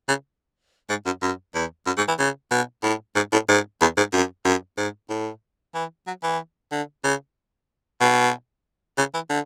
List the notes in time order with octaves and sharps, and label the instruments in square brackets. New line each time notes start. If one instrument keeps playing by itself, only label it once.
[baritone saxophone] C#3
G#2
F#2
F#2
E2
F#2
G#2
E3
C#3
B2
A2
G#2
A2
G#2
E2
G#2
F#2
F#2
G#2
A2
E3
F#3
E3
D3
C#3
B2
C#3
E3
D3